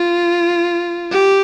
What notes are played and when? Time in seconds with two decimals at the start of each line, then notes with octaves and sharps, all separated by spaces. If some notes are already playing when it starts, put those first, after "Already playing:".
Already playing: F4
1.12 G4